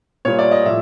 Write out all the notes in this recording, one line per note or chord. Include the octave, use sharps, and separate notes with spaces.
A#2 G3 C#5
D5
D#5
A2 F3 E5